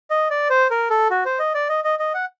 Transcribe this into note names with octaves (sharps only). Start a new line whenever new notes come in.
D#5
D5
C5
A#4
A4
F#4
C5
D#5
D5
D#5
D#5
D#5
F#5